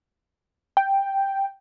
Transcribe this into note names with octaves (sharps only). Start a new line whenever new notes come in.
G5